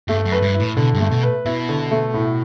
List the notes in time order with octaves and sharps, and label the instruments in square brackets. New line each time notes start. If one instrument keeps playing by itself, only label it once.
[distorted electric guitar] G2 [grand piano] A3
[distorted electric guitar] F#2
[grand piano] B4
[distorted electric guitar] G2
[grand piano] E4
[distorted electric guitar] A2
[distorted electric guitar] B2 [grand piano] D3
[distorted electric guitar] G2
[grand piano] A3
[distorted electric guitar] B2
[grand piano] B4
[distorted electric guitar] B2 [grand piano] E4
[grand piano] D3
A3
A2